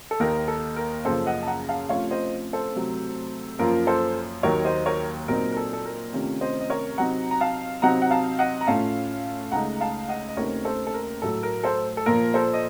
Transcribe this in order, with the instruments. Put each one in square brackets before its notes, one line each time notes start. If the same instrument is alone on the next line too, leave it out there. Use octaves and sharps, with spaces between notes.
[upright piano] A4
D#2 D#3 A#3 D#4 A#4
A4
A#4
F#2 C#3 F3 A#3 A4 C5
D#5 F#5
A5
F#5 A#5
F5 A5
C3 F3 A3 C#4 F4 C#5 F5
C5 D#5
A4 C5
C3 F#3 A3
F#2 F3 A#3 F4 A#4
A4 C5
D#2 D#3 F#3 A#4 C#5
C5 D#5
A#4 C#5
A#2 F#3 C4 D#4 A#4
A#4
A4
A4
A#4
C3 D#3 A3 C#4 F4
C5 D#5
D#5
A#4 C#5
C3 F#3 C4 D#4 F#5 A#5
A#5
F5 A5
C3 F#3 C4 D#4 F#5 A#5
F#5
F5 A5
D#5 F#5
A#5
A2 A3 C#4 F4 F5 A5
C#2 C#3 A3 D#4 F#5 A#5
F5 A5
D#5 F#5
D#5
D#2 C#3 A3 C4 D#4 A#4 C#5
A4 C5
A4
A#4
A2 F#3 A3 A4
A#4
A4 C5
A4
A#2 F3 A#3 F4 A#4
A4 C5
D#5